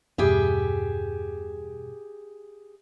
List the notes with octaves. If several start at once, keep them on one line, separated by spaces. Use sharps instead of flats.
E2 G2 B2 G4 G#4 E5